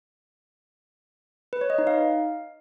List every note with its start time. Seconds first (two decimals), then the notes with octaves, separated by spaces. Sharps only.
1.53 B4
1.61 C#5
1.70 D#5
1.78 D#4
1.87 F5